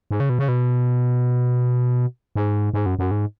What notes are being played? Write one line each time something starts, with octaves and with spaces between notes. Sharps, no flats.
G#2
C#3
B2
C#3
B2
G#2
G#2
F#2
F#2
G#2